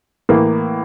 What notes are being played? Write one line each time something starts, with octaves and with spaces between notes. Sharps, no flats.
A2 E3 A#3